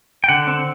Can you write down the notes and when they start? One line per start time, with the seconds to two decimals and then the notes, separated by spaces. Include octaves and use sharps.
0.24 G5
0.29 D3 F#5
0.47 C4